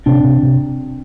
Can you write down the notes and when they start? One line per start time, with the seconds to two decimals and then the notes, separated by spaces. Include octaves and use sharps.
0.06 C3 C4 D4
0.24 C3
0.43 C3